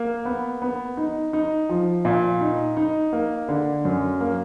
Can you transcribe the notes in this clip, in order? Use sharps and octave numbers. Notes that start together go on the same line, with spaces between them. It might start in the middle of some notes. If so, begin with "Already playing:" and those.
Already playing: A#3
B3
B3
D#4
D#4
F3
A#2
D#4
D#4
A#3
D3
F#2
A#3